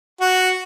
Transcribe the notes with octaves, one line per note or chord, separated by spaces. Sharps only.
F#4